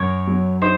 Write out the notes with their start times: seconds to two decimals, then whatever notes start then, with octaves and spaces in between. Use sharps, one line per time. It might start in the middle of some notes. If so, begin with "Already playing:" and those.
Already playing: F#2 A#4 C#5
0.27 F#3
0.62 D#4 C5